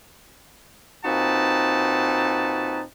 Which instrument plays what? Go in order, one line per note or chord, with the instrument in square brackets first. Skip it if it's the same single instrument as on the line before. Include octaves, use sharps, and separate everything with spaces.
[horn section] A#2 C4 D#4 F#4 B4 A5